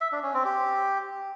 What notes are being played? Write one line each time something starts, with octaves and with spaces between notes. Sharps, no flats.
E5
D4
C#4
C4
G4